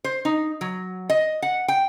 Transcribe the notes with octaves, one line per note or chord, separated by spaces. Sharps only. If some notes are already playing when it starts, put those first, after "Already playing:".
C5
D#4
F#3
D#5
F#5
G5